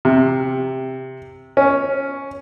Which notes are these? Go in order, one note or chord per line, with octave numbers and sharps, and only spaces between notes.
C3
C#4